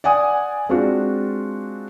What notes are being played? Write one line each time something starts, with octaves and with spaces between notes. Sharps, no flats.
D5 F#5 G#5 D#6
G#3 C4 D4 F4 F#4